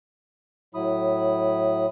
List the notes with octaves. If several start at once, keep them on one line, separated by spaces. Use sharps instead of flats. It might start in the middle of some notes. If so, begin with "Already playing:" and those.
A2 F#3 E4 B5 D#6